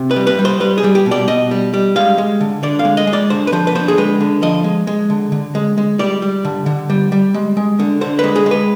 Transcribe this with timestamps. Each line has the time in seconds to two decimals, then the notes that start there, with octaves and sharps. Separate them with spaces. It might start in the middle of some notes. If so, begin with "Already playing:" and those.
Already playing: C3
0.11 B4
0.16 G3
0.27 B4
0.39 G3
0.45 C5
0.60 G3 B4
0.78 G#4
0.84 G3
0.95 G4
1.06 B2
1.11 D5
1.28 B2 D#5
1.51 G3
1.74 G3
1.95 G#3 F5
2.18 G#3
2.40 D3
2.63 D3 D5
2.79 F5
2.85 G#3
2.97 D#5
3.07 G#3
3.13 D5
3.30 D3 C5
3.47 B4
3.52 F3 C5
3.67 B4
3.75 D3 C5
3.88 G#4
3.98 G#3 B4
4.21 D3
4.42 F3 D#5
4.64 G#3
4.87 G#3
5.10 D3
5.32 D3
5.55 G#3
5.78 G#3
5.99 G3 D5
6.22 G3
6.45 D3
6.66 D3
6.90 G3
7.12 G3
7.34 G#3
7.57 G#3
7.79 D3
8.01 D3 C5
8.19 G#3 B4
8.36 G#4
8.46 G#3
8.51 B4